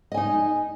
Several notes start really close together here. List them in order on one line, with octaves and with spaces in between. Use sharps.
D#5 G#5 D#4